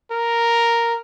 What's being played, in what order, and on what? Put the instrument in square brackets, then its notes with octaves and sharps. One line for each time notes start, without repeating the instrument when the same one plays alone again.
[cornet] A#4